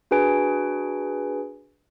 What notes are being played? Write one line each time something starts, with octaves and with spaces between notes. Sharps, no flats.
D4 F#4 G#4 B4 G#5 D7